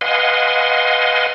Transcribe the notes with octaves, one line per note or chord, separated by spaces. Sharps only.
B4 D#5 F5 F#5 G#5 C6